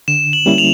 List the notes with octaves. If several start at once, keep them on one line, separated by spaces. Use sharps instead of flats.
D3 E7
F#7
G3 A#3 C#4 E4
F7